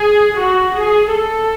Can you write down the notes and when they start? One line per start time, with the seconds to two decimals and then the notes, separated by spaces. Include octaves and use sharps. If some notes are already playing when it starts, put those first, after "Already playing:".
Already playing: G#4
0.40 F#4
0.77 G#4
1.13 A4